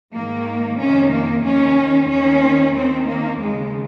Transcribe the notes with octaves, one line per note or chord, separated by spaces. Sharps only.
G#2 D#3 A#3
F2 C3 D#3 C#4
A#3
D#2 D#3 C#4
D#2 D#3 C#4
D#2 D#3 C4
A#3
D#2 C#3 G#3